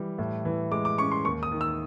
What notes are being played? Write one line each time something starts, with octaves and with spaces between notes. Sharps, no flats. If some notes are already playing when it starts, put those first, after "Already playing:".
Already playing: E3 G3
A2
E3
G#3 D6
D6
C#4 C#6
C6
D#2 C#6
D#6
D#3
E6